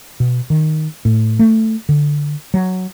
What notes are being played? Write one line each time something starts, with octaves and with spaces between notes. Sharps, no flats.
B2
D#3
A2
A3
D3
F#3